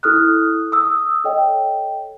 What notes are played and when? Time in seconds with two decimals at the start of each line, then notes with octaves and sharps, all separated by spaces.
0.03 E4 A4 D#6 F6 F#6
0.72 D#6 E6
1.24 A4 C#5 D#5 G5